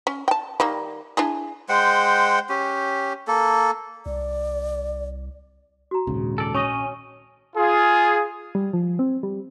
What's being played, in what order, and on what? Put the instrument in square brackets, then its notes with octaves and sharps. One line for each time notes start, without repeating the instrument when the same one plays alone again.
[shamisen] C#4
G5 A5
D#3 G3 A#3
D4 E4 G#4
[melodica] G#3 C5 F#5 G5
C#4 G4
A#3 A4
[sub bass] C2 [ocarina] D5
[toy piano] F#4 A#5
[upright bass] A#1 [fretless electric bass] D#2 G#2 C#3
[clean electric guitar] A4 D5
[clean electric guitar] C#4 D#5 [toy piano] C#5 C#6 D#6
[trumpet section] F4 G#4
[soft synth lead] G3
F3
C4
G3